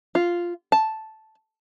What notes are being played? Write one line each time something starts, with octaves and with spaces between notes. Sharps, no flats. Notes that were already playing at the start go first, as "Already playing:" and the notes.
F4
A5